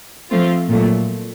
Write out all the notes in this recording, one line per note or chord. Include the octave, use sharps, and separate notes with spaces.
F3 A3 C4 F4
A#2 F#3 A3